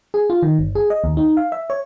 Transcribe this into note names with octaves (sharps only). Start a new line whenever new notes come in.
G#4
F4
D#3
G1
G#4
D#5
D#2
D#4
F5
E5
C#5